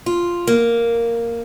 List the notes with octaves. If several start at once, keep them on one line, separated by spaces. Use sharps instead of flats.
F4
A#3